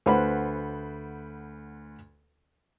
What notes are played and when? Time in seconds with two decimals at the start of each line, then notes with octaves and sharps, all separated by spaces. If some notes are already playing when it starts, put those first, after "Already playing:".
0.06 D2 B4 C5 F#5 B5